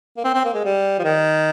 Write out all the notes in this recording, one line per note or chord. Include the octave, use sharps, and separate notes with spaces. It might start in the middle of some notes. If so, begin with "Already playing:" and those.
A#3
C4
C4
A#3
G#3
G3
F3
D#3